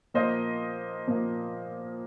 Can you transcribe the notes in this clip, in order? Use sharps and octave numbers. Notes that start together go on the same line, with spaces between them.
A#2 F3 A#3 C5 D#5
A#2 F3 A#3